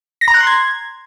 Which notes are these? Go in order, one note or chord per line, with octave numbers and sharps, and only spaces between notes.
A#6
A#5
F#6
C6
G#6